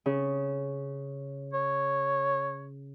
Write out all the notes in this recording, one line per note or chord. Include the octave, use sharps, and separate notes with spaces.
C#3
C#5